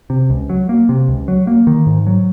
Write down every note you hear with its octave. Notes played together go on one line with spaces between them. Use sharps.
C3
C#2
F#3
A#3
C3
C#2
F#3
A#3
D#3
G#2
F#3